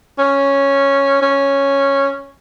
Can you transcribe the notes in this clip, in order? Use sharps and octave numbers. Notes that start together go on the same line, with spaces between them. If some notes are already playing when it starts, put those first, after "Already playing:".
C#4
C#4